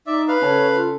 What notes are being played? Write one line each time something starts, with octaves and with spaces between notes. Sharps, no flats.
D#4 D5 E5
B4 F5
C#3 A4 C#5
F4